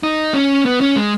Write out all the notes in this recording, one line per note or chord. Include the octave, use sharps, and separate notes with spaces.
D#4
C#4
B3
C#4
G#3